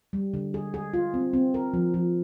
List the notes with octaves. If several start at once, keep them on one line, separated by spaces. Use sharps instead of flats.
G3
D3
G#4
G#4
F4
C4
C4
A#4
F3
F3